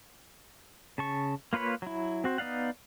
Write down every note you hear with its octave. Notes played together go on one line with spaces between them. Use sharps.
C#3 A5 C#6
A#3 F4 B4 C#5 B5
F#3 E4
C4 F#4 C5
B3 D#4 D5 F5 F#5